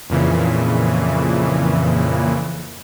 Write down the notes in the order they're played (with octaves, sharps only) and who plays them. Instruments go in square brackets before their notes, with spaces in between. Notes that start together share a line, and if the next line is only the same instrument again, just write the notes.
[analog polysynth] F2 A#2 C#3 E3